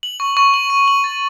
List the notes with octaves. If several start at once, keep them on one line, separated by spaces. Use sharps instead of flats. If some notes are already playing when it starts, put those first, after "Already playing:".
F#7
C#6
C#6
F#7
D#7
F#7
A6